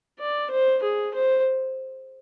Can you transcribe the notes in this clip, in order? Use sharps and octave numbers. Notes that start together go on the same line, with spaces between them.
D5
C5
G#4
C5